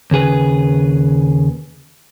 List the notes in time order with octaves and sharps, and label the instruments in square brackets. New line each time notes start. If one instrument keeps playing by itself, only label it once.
[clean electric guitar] D#2 C#3 G#4 B4